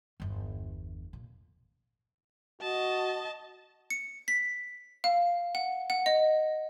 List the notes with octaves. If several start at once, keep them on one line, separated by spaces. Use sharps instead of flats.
G1 E2
A#2
F#4 D#5 A5
C#7
B6
F5
F#5
F#5
D#5